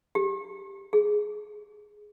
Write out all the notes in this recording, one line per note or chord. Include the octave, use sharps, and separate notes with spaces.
G4
G#4